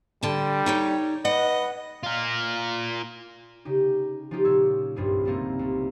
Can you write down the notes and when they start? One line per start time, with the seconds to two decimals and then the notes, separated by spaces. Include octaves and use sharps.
0.23 D3 G3 A5
0.66 D#4 G4 C#5
1.25 B4 D#5 F#5
2.03 F4 A#4
3.65 C#3 D#4 G4
4.31 F3 A#3 C#4 D#4 F4 G4
4.45 A#2 G4 C#5 E6
4.96 F#1 C2 G2 F3 G#4 A#4
5.25 F3 G3 A3 A#3 C4 D#4
5.59 C2